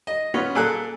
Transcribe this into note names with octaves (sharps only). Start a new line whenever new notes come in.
D#5
B3 C#4 F4
A#2 G#4 A4 G#5 F#6